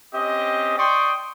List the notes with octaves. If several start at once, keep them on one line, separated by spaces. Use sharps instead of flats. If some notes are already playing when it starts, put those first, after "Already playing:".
C4 C#4 G4 D#5
D5 G5 C6 C#6 D#6